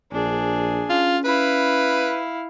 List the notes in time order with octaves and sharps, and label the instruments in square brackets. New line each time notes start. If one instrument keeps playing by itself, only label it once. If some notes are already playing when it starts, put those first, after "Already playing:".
[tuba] A#1 [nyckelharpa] D4 G#4
[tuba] C#4 [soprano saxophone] F4
[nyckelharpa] E4 F5 [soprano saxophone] B4